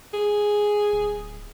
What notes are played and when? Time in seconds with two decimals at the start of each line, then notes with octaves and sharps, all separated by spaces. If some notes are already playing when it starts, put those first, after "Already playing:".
0.13 G#4
0.92 D1